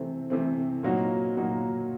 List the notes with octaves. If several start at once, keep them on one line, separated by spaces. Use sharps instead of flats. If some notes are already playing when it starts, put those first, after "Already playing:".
Already playing: C3 E3 A3 C4
C3 E3 A3 C4
A#2 F#3 A#3 D#4 F#4
A#2 F#3 A#3 D#4 F#4